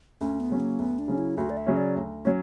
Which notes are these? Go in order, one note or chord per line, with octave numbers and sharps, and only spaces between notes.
D2 C#4
B3
C#3 F#3 C#4
A#3
D2 B3
D4
C#3 F#3 C#4
E4
D2 F#4
D5
E5
C#3 F#3 C#4
D5
D2
F#3 C#4 C#5